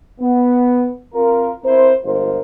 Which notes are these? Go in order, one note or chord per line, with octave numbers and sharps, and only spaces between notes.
B3
C4 F4 A#4
C4 E4 A#4 C5
G1 G#3 F4 A#4 C5